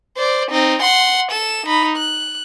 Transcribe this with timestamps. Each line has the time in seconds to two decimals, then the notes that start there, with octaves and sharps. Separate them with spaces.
0.17 C5 D5
0.51 C4 D#4
0.82 F#5 C6
1.31 A4 E7
1.66 D#4 B5
1.97 F#6